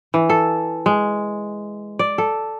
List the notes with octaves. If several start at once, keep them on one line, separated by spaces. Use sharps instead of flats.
E3
A4
G#3
D5
A4